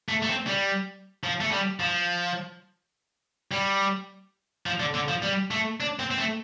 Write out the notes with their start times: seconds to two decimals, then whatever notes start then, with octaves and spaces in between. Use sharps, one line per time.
0.09 A3
0.22 A3
0.29 C4
0.47 G3
1.24 F3
1.40 A3
1.51 G3
1.80 F3
3.51 G3
4.66 F3
4.80 D3
4.94 D3
5.08 F3
5.23 G3
5.51 A3
5.80 D4
5.99 C4
6.11 C4
6.18 A3